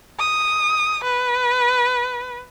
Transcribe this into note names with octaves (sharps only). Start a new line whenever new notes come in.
D#6
B4